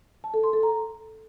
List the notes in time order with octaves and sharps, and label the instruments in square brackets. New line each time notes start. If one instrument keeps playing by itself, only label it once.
[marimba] A5
A4
C6
A4
A#5